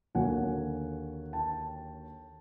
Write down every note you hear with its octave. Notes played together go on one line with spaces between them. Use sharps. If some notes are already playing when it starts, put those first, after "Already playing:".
D#2 D3 F#3 A#3 F#5 G#5
G5 A5